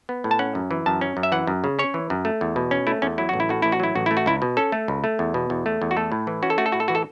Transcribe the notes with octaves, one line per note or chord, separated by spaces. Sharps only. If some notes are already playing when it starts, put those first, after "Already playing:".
B3
A2
A5
C#4 F#5
F#2
E3
F#2 A5
C#4
F#2
E5
E3 F#5
F#2
C#3
C#4 C#5
E3
F#2
A3
E2
B2
C#4
A3 E4
E2 C#4
F#3 E4
A1 F#4
E4
A2 F#4
A1 E4
F#4
F#3 E4
A1 F#4
A3 E4
F#4
C#2 E4
B2
C#4 A4
A3
C#2
A3
E2
B2
E2
A3
E2
F#4
A3 A4
A2
E3
C#4 F#4
A4
A3 F#4
A4
A2 F#4
A4
E3 F#4
A4